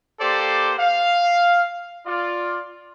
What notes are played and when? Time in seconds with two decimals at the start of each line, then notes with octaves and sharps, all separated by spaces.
0.21 A#3 G4 A4 C5 D5 C6
0.78 F5
2.06 F4 D5